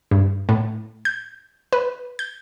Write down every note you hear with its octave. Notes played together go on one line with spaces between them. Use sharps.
G2
A2
G6
B4
G6